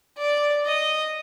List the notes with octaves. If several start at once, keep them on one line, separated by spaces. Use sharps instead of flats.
D5
D#5